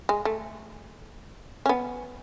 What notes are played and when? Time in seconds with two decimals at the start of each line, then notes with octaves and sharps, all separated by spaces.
0.09 G#3
0.25 A3
1.66 C#4
1.69 B3